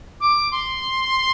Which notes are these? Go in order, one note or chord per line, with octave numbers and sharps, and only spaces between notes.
D6
C6